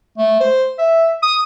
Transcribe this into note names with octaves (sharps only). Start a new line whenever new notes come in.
A3
C5
E5
D#6